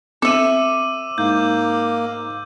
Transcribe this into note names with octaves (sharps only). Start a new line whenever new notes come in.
C4 A4 E5 D6 E6 D#7
G#2 A#3 G6